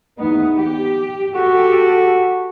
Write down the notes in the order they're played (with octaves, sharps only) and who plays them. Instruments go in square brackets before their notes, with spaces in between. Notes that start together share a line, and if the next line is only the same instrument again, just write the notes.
[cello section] E2 B3 D#4
G4
[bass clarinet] F#4 [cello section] G4 A4